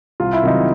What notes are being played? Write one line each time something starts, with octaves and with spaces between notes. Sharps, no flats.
C2 F4
E4
C3 D#3 F#3 D#4